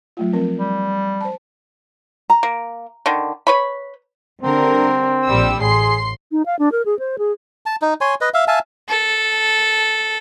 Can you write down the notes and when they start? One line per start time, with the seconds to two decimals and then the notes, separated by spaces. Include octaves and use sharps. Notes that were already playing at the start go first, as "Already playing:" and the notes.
0.17 F#3 A3 F4
0.33 F3 C4 A#4
0.59 G3
1.21 C5 A5
2.30 A#5
2.43 A#3
3.06 D3 D#3
3.47 B4 C#5 B5
4.42 D3 G3 C4 A#4
5.27 A#1 G3 E6
5.60 A1 G#4 C6 C7
6.32 D#4
6.46 F5
6.59 D4
6.72 A#4
6.85 G#4
6.99 C5
7.18 G#4
7.66 A5
7.82 D#4
8.01 C#5 G#5 C6
8.21 B4 D#5
8.34 E5 F5
8.48 E5 F5 G#5 A5
8.88 A4